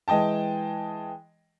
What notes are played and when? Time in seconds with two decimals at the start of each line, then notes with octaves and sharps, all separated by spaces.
0.08 E3 G#3 D#5 G5 A5